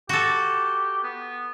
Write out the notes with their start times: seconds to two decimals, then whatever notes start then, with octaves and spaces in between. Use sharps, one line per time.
0.09 F#4 G4 A4
1.03 B3